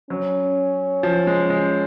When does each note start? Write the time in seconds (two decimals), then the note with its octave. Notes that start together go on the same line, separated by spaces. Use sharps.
0.10 F#3 C#4
1.03 F3
1.27 G#3
1.50 G#3